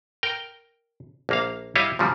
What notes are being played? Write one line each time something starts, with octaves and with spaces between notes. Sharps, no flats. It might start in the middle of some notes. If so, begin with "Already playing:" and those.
A#4 G5
A#1 A#3 F5
G3 E4 C#5 D#5 F5
A#2 C#3 F3 G3